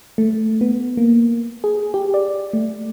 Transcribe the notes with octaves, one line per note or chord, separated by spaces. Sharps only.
A3
B3
A#3
G#4
G4
D5
A3